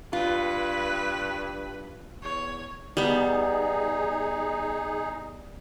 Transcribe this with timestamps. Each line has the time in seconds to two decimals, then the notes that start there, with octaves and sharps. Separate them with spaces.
0.13 G2 F4 B4
2.23 E2 C#5
2.97 G3 B3 D#4 G#4